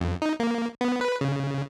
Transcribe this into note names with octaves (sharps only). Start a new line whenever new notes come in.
F2
D#4
A#3
B3
B4
C#3